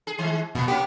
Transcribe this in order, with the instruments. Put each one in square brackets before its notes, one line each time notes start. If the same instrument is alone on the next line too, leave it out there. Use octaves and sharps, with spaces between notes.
[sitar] G#4
D#3 G#3
[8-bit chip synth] B2 [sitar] A#3 B3
[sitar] A#3 C#4 [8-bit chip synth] G4